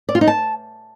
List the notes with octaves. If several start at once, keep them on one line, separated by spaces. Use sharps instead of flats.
D5
F4
D#4
A5